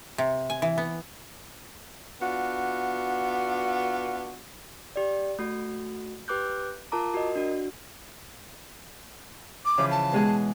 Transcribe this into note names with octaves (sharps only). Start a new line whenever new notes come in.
C3
G#5
E3
B3
B3 D4 F4 F#4
G4 D5
A3 F#4
G4 B4 D6 F#6 G6
F4 A#4 A5 A#5 D6
F#4 A#4 D#5
D4 F#4
D6
C#3 E3 F3
A5
B2 G#3 G#4